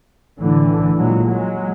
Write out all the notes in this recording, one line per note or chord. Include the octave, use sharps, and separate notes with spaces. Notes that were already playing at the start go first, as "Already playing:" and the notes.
A2 D3 E3
A#2 F#3 G#3
F#3 G#3